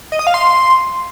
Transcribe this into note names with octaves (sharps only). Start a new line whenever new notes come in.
D#5
D#6
F5
C6